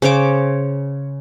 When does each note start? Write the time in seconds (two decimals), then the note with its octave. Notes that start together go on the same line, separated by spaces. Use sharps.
0.02 C#3 C5 C#5 D6